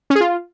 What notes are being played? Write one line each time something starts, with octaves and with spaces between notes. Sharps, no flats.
C#4
G#4
F4